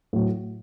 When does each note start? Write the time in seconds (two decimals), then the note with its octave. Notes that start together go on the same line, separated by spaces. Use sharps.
0.13 A2 F#3